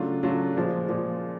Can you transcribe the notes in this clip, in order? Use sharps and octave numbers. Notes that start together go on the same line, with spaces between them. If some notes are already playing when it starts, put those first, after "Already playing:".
Already playing: C#3 F#3 A3 D4 F4
C#3 F#3 A3 D4 F4
A#2 F3 G#3
A#2 F3 G#3